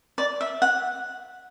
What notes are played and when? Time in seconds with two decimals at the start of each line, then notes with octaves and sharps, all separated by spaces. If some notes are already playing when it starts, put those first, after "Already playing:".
0.18 D5
0.41 E5
0.62 F#5